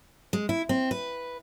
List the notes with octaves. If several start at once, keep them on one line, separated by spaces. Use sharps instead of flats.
G#3
E4
C4
B4